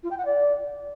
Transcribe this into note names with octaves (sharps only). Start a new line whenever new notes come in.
F4
G5
F#5
D5